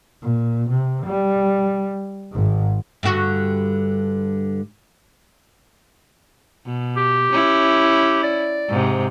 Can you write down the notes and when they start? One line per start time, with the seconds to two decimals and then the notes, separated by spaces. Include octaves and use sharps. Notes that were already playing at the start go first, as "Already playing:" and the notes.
0.23 A#2
0.70 C3
1.06 G3
2.32 G#1 G#2
3.03 G2 D3 F#4
6.66 B2
6.97 G4
7.31 C#4 E4
8.23 D5
8.69 G#2 C3